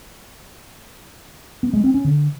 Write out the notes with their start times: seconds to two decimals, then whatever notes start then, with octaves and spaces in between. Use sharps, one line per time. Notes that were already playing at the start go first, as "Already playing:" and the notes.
1.63 B3
1.73 G#3
1.84 C4
1.94 C#4
2.04 D3